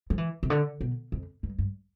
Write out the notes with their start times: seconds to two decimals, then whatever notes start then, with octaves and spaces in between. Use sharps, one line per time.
0.10 F3
0.18 E3
0.43 C3
0.50 D3
0.81 B2
1.12 F2
1.43 G2
1.58 G2